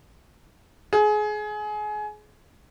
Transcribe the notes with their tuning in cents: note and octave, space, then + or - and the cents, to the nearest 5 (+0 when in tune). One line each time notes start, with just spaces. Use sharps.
G#4 +25